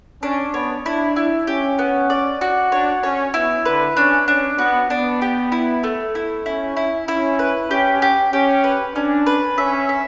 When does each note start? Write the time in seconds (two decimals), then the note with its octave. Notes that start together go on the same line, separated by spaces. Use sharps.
0.22 C#4 D4
0.54 B3 C#5
0.86 D4 E4
1.16 E4
1.47 C#4 G4
1.79 B3
2.10 D5
2.41 F#4
2.72 D4 C#5
3.03 C#4 C#5
3.34 B3 E4
3.65 D3 B4
3.97 C#4 D4
4.28 C#4 D4
4.58 B3 F#4
4.90 B3 D4
5.22 G4
5.52 E4
5.83 A3
6.15 E4
6.46 C#4 E4
6.77 E4
7.08 C#4 E4
7.39 B4
7.70 C#4 G4
8.02 G4
8.33 C#4 G4
8.64 B4
8.96 C#4 D4
9.26 B4
9.57 C#4 E5
9.89 E5